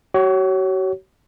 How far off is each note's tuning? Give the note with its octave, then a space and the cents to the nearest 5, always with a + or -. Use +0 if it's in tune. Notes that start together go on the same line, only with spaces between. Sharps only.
F#4 +40 C#5 +0